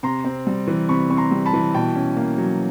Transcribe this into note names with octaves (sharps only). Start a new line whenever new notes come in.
C3 A#5 C6
C4
G3
E3
C3 B5 C#6
C4 C#6
A#5 C6
G3
A5 B5
E3
B2 G5 A5
C#4
A#3
F#3